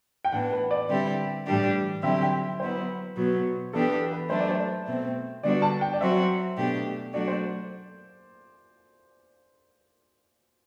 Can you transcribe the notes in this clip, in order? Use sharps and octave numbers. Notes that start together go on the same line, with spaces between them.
G5
A2 E3 B3 D4 F#5
B4
D5
D3 G3 C4 E4 G4
A2 E3 G3 D4 G4
D3 F#3 C4 E4 G4 E5
G5
F#3 B3 E4 C5
B2 F#3 B3
E3 B3 D4 G4 A4
A4
B4
F#3 A3 D4 C5
D5
C5
B2 A3 C4
D3 G3 B3 D4 F#4 D5
A5
G5
D5
F#3 C4 F#4 E5
B2 A3 D4 G4
F#3 A3 D4 F#4 D5
C5